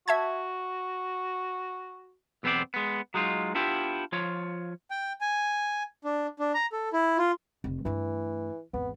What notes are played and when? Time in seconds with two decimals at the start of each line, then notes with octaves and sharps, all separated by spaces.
0.08 F#4 E5 A5 G#6
2.43 B1 E2 B3 C4 C5 D5
2.74 G#3 B3
3.14 F#3 G#3 D#4 F4
3.55 B3 D4 E4 F4 G4
4.12 F3 F4 C#5
4.91 G5
5.21 G#5
6.04 D4
6.39 D4
6.54 A#5
6.72 A4
6.93 E4
7.18 F4
7.64 F1
7.85 G2 E3 A3
8.73 G#1 E2 B3